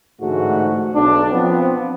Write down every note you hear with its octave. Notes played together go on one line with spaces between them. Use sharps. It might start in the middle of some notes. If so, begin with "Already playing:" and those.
A1 G#2 D3 G#3 A3 F#4
B1 D4
F3 B3 C4